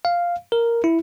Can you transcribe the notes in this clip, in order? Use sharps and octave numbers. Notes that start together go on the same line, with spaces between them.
F5
A#4
E4